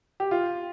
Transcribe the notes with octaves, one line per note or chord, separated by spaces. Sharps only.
G4
F4